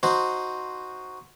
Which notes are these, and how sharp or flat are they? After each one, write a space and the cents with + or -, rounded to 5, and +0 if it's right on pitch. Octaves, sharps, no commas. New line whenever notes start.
D#4 +0 F#4 +0 C5 +0